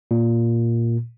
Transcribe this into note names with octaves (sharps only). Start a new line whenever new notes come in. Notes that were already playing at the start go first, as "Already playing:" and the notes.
A#2